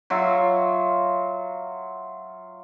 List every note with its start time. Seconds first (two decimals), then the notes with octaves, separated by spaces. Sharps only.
0.10 F#3 F4 E5